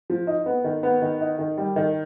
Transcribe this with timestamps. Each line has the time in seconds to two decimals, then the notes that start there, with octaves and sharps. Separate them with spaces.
0.10 F3
0.27 D#4
0.46 B3
0.64 D#3
0.83 B3
1.02 D#3
1.21 D#4
1.39 D#3
1.57 G3
1.76 D#3